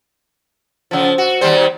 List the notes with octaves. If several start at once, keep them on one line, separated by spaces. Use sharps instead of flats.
C#3 F3
F#4
D#2 G3 C5